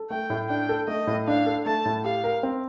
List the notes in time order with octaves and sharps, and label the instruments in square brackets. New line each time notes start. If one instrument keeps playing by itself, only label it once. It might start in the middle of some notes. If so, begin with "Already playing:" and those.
Already playing: [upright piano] A4
[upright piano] A3 [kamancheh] G5
[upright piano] A2
[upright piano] D4 [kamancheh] G5
[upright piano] A4
[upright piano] A3 [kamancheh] D#5
[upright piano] A2
[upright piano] D4 [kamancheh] F5
[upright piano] A4
[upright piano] A3 [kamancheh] A5
[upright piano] A2
[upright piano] G4 [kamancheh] F5
[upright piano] A#4
C4